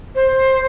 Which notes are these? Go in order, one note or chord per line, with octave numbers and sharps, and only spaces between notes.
C5